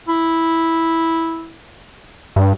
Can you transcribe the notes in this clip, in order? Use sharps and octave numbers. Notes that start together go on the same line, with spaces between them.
E4
G2